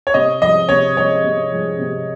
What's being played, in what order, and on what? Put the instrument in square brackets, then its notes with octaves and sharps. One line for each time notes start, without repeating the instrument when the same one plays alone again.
[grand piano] C#5
[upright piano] C3 [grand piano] D#5
[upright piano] F3 G#3 [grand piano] D#5
[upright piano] C3 [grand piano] C#5
[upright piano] F3 G#3 [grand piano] C#5
[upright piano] C3
F3 G#3
C3